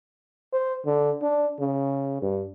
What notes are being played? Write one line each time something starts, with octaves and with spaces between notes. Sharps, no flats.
C5
D3
D4
C#3
G2